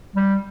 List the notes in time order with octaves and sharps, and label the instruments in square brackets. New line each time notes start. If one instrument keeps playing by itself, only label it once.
[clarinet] G3